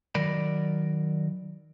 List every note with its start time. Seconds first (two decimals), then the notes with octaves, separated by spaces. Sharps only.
0.15 D#3 F#3 A#4 D5 B5